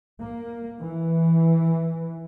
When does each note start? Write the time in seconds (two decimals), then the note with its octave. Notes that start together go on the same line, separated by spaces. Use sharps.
0.21 A#3
0.80 E3